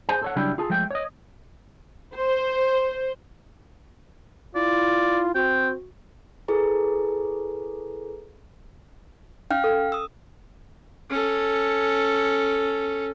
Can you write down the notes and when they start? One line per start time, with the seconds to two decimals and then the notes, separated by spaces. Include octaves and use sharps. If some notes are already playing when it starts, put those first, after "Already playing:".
0.09 G#4 C5 G#5
0.22 A4 C#5 F#5
0.36 C#3 F#3 G3 D4 E4 G4
0.58 F4 G#4 A4
0.70 F3 G#3 A3 G5
0.91 C#5 D#5
2.15 C5
4.55 E4 F4 D5
5.35 C4 F#4 G5
6.48 E4 G#4 A4 B4 A#5
9.51 C#4 F5 G5 F6
9.64 A4
9.92 D#6 E6
11.10 C#4 A4